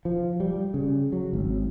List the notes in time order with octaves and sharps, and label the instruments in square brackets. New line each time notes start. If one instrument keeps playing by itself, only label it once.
[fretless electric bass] F3
G3
C#3
F#3
G#1